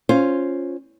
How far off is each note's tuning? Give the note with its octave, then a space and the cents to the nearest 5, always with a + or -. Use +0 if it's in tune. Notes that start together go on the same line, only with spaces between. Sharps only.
C#4 +0 F4 +0 C5 +0